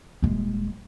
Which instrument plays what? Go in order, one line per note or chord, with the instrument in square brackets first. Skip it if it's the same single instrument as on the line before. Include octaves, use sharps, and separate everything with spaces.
[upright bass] D#1 G#3